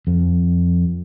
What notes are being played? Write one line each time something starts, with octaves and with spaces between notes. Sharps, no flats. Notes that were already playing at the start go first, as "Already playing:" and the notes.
F2